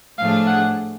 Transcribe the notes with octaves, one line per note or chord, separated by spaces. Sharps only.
A2 F3 A3 D4 G#4 F5
F#5